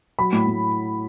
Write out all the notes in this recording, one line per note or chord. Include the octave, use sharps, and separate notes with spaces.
F#3 B5
A2
A2